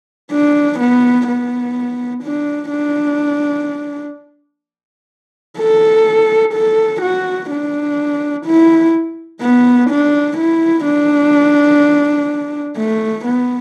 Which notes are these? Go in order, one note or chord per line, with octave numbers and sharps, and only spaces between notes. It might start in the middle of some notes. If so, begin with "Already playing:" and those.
D4
B3
B3
D4
D4
A4
A4
F#4
D4
E4
B3
D4
E4
D4
A3
B3